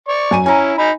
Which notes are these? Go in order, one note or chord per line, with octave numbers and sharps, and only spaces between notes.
D5 C#6
F#2 G#5 D#7
C#4 E4 G#5 A#5
D#4 B5